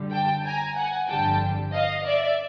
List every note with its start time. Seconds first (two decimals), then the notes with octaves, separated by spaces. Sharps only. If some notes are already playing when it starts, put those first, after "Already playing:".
Already playing: F#2 D3 G3
0.12 G5 A5
0.44 G#5 A#5
0.77 F#5 G#5
1.09 G1 F2 D3 G3 G5 A5
1.73 D#5 F5
2.06 D5 E5